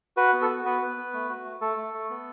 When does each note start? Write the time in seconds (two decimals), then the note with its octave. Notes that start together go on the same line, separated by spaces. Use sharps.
0.17 F#4 B4
0.33 B3
0.42 A4
0.49 F#4
0.65 B3 B4
0.81 B3
0.97 B3
1.13 A3
1.29 F#4
1.45 A3
1.61 A3 A4
1.77 A3
1.94 A3
2.10 B3